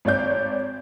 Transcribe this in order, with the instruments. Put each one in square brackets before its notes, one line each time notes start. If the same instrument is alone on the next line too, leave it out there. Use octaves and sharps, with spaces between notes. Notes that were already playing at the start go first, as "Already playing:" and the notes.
[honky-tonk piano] G#1 C#5 D5 G6